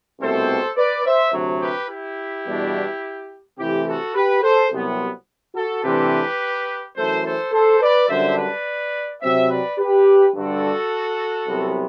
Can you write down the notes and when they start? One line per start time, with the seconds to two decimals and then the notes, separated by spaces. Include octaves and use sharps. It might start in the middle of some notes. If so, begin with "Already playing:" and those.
0.20 C2 B2 A3 C4 A4 C5
0.76 B4 D5
1.05 C5 E5
1.33 D2 C3 F#3
1.61 G4 B4
1.89 E4 G4
2.46 E2 B2 G3 D4
3.58 C3 E3 A3 E4 G4
3.86 F#4 A4
4.15 G4 B4
4.42 A4 C5
4.71 C2 C3 F#3 B3
5.55 F#4 A4
5.84 C3 E3 A3 D4 G4 B4
6.96 F#2 E3 A3 A4 C5
7.24 A4 C5
7.52 A4 C5
7.80 B4 D5
8.08 F#2 D3 G3 D4 C5 E5
8.37 B4 D5
9.22 C3 F#3 C4 C5 E5
9.49 B4 D5
9.78 G4 B4
10.34 G2 D3 G3 D4 F#4 A4
11.47 C2 C3 F#3 B3